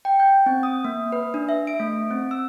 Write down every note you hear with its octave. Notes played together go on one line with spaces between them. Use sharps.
G5
G6
C4
D#6
A#3
B4
D4
E5
D7
A3
C4
E6